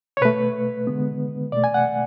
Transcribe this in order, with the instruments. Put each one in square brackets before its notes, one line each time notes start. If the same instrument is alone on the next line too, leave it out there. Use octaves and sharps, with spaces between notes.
[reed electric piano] C#5
B2 A3 B4
D3 G#3 B3
B2 A3 D5
G#5
F#5